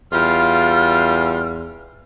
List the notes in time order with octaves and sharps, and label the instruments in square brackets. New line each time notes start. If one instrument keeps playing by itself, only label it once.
[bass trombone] E2 [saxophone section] G3 F4 [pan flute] F6